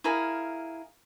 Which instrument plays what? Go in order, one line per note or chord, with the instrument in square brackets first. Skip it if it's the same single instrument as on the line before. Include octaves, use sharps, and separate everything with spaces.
[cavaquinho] E4 G#4 A#4 F5